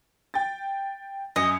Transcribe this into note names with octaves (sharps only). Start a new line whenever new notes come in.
G5 A6
F#2 D#5 G#5 C#7